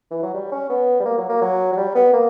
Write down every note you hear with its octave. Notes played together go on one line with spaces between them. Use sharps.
E3
F#3
G3
C#4
B3
G3
A#3
F#3
A#3
F#3
F#3
G3
B3
A#3